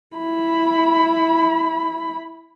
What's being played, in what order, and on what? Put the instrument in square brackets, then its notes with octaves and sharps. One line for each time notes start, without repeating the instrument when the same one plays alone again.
[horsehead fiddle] E4 B5